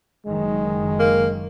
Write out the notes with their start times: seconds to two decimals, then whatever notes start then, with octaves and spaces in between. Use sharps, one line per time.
0.26 F#1 D#3 G#3
0.99 A#3